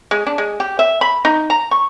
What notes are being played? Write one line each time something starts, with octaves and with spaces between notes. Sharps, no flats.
G#3
D4
G#3
G4
E5
B5
D#4
A#5
C#6